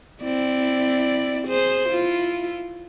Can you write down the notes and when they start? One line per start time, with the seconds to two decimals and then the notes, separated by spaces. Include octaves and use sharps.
0.23 C4 E4 D5
1.48 G#4 C5
1.86 E4 F4